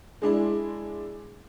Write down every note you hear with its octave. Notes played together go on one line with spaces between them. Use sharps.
G#3 D4 E4